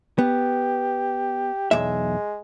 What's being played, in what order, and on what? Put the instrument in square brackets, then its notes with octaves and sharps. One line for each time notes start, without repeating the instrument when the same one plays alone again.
[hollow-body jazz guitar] B3 [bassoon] G4
[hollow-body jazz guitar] B1 E2 E5 [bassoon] G#3